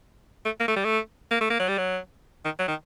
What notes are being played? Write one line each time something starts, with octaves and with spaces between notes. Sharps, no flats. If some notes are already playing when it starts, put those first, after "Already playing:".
A3
A#3
A3
G3
A3
A#3
A3
A#3
F#3
G3
F#3
D#3
F#3
D#3